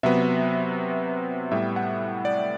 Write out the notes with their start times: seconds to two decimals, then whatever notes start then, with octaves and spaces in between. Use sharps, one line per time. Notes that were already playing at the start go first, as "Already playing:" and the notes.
0.03 C3 F#3 B3 E5
1.51 A2 G3 B3 E5
1.76 F#5
2.25 D5